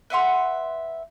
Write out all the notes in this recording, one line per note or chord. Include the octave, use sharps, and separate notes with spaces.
B4 E5 F#5 C6